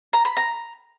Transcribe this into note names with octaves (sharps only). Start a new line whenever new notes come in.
A#5
B5
A#5